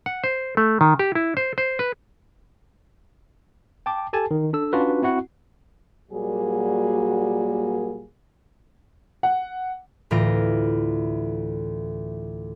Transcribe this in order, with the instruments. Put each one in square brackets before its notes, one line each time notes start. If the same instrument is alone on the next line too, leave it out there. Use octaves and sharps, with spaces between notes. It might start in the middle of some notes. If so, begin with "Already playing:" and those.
[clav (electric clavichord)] F#5
C5
A3
D#3
G4
E4
C5
C5
B4
[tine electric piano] G5 A5 D6
G4 A4 G#5 A5
D#3
D4 A4 E6
C#4 D4 F4 F#4 B4
C4 E4 F#4 F#5
[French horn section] A#2 F#3 G3 A#3 F#4 G#4
[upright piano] F#5
[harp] D2 A2 E3 F4 A#6 D7